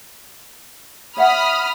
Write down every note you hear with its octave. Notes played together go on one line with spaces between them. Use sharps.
C#5 E5 F#5 B5 D#6 F6